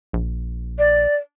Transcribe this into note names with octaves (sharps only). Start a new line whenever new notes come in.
A#1
D5